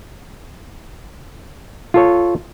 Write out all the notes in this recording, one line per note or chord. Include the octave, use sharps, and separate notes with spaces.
F4 A4 C#5